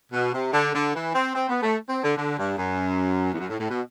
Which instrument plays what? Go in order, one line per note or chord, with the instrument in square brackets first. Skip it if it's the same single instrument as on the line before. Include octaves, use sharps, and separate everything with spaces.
[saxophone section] B2
C3
D3
D3
E3
C4
C4
B3
A3
C4
D3
D3
G2
F#2
E2
F#2
A2
A2
B2